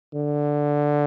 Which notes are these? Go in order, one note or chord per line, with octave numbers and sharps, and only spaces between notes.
D3